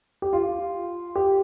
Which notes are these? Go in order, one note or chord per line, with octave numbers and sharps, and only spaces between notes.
G4
F4
G4